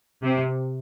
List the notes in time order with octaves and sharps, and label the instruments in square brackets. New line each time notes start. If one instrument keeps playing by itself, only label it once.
[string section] C3